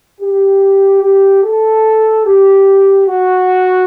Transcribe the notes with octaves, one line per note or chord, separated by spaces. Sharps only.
G4
G4
A4
G4
F#4